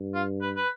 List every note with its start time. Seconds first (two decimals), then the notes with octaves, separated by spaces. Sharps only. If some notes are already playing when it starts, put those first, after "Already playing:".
Already playing: G2
0.15 F4
0.42 B4
0.56 B4